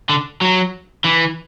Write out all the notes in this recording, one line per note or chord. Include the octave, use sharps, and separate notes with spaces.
D3
F#3
E3